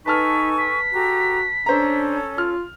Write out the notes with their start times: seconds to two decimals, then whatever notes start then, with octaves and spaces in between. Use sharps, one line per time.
0.06 D#4 A4 B4 G#5 A5 C#6 F6 B6
0.58 B6
0.93 F#4 G4 A4 A#5
1.66 C#4 D4 A4 C5 A#5
2.38 F4 F6